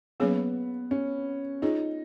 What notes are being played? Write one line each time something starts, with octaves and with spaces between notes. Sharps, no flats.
F#3 A#3 B3 C#4 G#4 C#5
C#4
C#4 D#4 F4 G#4 C#5